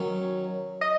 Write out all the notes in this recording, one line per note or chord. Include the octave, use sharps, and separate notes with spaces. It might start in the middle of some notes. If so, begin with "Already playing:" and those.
Already playing: D#3 F#3 C#4
D#5